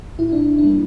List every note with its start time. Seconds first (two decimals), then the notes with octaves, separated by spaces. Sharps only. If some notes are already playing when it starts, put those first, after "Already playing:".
0.19 A2 E4
0.32 D4
0.58 D4
0.64 G3 A#3